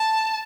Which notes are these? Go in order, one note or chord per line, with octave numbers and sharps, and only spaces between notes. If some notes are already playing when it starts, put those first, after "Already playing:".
Already playing: A5